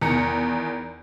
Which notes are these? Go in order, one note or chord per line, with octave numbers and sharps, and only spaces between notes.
E2 D#3 A#5 C#7